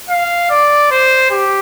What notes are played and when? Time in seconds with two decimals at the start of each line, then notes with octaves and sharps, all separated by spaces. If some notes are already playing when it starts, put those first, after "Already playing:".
0.10 F5
0.51 D5
0.91 C5
1.31 G4